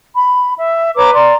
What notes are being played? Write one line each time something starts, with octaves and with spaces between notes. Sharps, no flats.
B5
E5
B4 C#5 A#5 D6
D5 A#5 C6